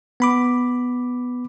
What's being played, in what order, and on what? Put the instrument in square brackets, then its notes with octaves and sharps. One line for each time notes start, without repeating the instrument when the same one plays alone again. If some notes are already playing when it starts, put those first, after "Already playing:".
[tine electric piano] B3 B5 D6